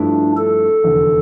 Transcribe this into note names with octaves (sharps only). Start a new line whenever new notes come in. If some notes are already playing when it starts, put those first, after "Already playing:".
Already playing: G2 F3 A3 D4 E4
A4
F1 E2 D3